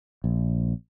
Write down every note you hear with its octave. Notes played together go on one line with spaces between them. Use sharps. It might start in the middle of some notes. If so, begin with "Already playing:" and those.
A#1